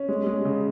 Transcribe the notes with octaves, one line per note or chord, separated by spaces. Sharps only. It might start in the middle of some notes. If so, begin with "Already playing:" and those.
Already playing: C#4
G#3
G#3
C#3